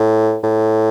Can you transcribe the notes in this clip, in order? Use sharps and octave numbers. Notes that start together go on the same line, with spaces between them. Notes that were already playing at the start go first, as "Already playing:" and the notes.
Already playing: A2
A2